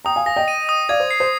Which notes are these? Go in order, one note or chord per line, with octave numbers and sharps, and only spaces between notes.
G5 A#5 D#6
F5 G#5
F5 G#5 A#6
D#5 G5
D#7
D#6
D5 F5 G#6
C5
C7
C5